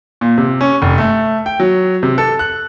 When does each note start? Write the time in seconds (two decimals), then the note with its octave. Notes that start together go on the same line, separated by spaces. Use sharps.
0.21 A#2
0.38 C3
0.61 C#4
0.82 F1
0.98 A3
1.46 G5
1.60 F#3
2.03 C3
2.18 A4
2.39 F#6